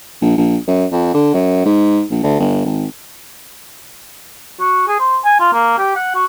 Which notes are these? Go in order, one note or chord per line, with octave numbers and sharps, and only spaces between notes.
A#1
A#1
F#2
F2
D3
F#2
G#2
A#1
D2
G1
G#1
F#4
G#4
C5
G#5
F4
A#3
G4
F#5
F#4